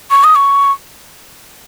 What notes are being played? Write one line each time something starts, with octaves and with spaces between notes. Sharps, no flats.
C#6
D#6
C#6